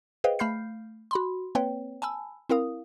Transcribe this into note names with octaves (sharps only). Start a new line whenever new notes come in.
G#4 B4 C5 D#5 F5 G5
A3 F5 B5 F6 G6 C7
F#4 B5 C6
A#3 C4 B4 C#5 G5
G#5 A5 B5 E6
C4 E4 A#4 F5 D#6